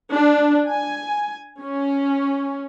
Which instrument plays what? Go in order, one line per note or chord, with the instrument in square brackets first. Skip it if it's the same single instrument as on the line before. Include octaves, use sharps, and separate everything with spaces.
[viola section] D4
G#5
C#4